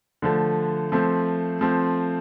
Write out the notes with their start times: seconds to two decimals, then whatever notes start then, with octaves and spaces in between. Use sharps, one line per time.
0.22 D3 F3 A3
0.92 F3 A3 C4
1.61 F3 A3 C4